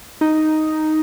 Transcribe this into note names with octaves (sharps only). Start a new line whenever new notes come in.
D#4